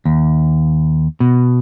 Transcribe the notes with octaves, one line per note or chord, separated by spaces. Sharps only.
D#2
B2